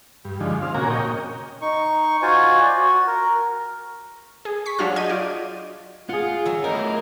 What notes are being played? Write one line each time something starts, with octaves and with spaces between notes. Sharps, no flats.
G2
D3 D#3 F3 G#3
C4 F5
A#2 C#3 A#3 F#4 G#5 A#5
A#2 C#5 D#5 G5
D#4 C#6
F4 F#4 C5 G#5
D5
F#4
A#4
G#4
C#6 B6
F#3 D4 F4 F#4 G#4 F6
D#5 G6 G#6 D#7
F4 D5
F4 G#4 F#5
F#3 E5
A3 D#4 E4 A#4